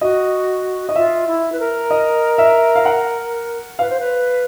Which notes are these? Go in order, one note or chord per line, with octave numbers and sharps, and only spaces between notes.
F#4 D#5
D#5
F4 E5
E4
B4
A#4
D#5
E5
F5
F#5
B4 F5
C5
B4